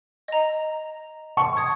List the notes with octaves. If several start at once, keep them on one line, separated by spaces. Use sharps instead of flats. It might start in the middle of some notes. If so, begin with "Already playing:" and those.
D#5 A#5
A5 C#6
D#6 G#6